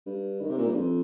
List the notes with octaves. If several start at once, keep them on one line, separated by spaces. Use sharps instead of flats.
G2
D#3
C3
A#2
G2
F2